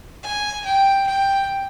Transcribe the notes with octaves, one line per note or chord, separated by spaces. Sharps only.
G#5
G5
G5